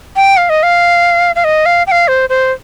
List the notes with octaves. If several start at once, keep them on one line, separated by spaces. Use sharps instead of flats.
G5
F5
D#5
F5
F5
D#5
F5
G5
F5
C5
C5